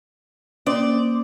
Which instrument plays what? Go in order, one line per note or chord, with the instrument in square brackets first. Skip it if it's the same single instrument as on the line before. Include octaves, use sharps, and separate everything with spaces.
[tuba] A#3 [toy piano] C#4 F4 D#6 [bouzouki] C5 D5